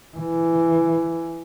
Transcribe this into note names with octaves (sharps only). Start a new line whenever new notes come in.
E3